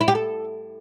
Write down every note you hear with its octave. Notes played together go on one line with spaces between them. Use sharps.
E4
G4
A4